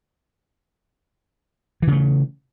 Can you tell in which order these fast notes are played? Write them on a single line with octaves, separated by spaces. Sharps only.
E3 C#3 A3